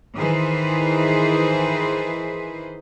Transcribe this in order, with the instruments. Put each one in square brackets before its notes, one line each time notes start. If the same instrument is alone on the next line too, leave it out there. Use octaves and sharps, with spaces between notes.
[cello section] D#3 E3 G#4 B4 C5